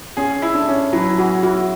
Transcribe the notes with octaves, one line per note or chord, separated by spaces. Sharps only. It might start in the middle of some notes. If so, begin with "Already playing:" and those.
C#4 G#4
E4
D4
C#4
F#3 E4
F#4 G#4
E4 F#4